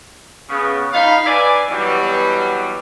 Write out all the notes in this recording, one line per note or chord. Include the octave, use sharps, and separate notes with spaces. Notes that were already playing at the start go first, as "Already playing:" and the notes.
C#3 B3
D#4 F5 B5
B4 D5 E5 G#5
B2 E3 F#3 G3